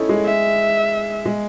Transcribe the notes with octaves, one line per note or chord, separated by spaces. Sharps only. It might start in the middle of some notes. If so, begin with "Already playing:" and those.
Already playing: A3 C#4 D#4 E4
G#3
E5
G#3